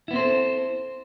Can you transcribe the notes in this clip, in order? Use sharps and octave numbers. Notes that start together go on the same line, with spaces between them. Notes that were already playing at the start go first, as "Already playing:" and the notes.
B3 C4 E4 A4 C5